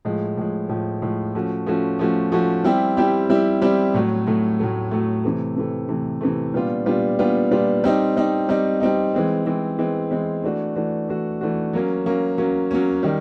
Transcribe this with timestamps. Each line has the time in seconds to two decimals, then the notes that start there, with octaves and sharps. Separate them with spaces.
0.05 A2 F3 G#3
0.37 A2 F3 G#3
0.69 A2 F3 G#3
1.02 A2 F3 G#3
1.35 F3 A3 C#4 F#4
1.66 F3 A3 C#4 F#4
1.99 F3 A3 C#4 F#4
2.32 F3 A3 C#4 F#4
2.64 G3 C4 E4 G4
2.97 G3 C4 E4 G4
3.29 G3 C4 E4 G4
3.62 G3 C4 E4 G4
3.94 A2 F#3 A3
4.27 A2 F#3 A3
4.59 A2 F#3 A3
4.91 A2 F#3 A3
5.24 C3 E3 A3
5.57 C3 E3 A3
5.89 C3 E3 A3
6.21 C3 E3 A3
6.54 A#2 G3 B3 D4 F4
6.86 A#2 G3 B3 D4 F4
7.19 A#2 G3 B3 D4 F4
7.51 A#2 G3 B3 D4 F4
7.84 G3 C4 D#4
8.17 G3 C4 D#4
8.49 G3 C4 D#4
8.81 G3 C4 D#4
9.14 E3 G#3 C4
9.46 E3 G#3 C4
9.79 E3 G#3 C4
10.11 E3 G#3 C4
10.44 E3 A3 D4 F#4
10.76 E3 A3 D4 F#4
11.09 E3 A3 D4 F#4
11.41 E3 A3 D4 F#4
11.73 F#3 A#3 C#4
12.06 F#3 A#3 C#4
12.38 F#3 A#3 C#4
12.71 F#3 A#3 C#4
13.03 D#3 G3